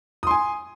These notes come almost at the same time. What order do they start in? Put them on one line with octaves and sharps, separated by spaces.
D#6 C6 G#5